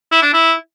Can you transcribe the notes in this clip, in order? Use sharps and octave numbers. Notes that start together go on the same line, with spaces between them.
E4
D4
E4